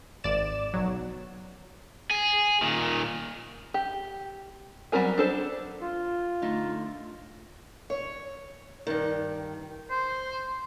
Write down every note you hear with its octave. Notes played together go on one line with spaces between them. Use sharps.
G#1 D5 E7
B1 F#3
G#4
A#2 D#3
G4
F#3 G3 C4 A#4 G#5
D4 A4 C5
F4
D3 A3 D#4
C#5
G2 D#3
C5